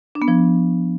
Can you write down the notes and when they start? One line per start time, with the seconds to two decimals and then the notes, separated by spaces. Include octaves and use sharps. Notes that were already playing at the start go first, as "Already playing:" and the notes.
0.15 D4
0.22 B3
0.28 F3